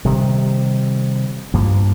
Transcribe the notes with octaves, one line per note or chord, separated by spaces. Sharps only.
C3 D#3 G3
G2 F3 A#3